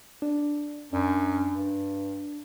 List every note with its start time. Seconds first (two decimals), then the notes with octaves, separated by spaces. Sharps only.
0.22 D4
0.93 F#2 D4
1.52 G2